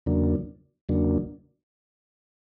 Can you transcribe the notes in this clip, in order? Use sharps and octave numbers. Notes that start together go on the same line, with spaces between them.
E2 C#3 F#3 A#3 D4
E2 C#3 F#3 A#3 D4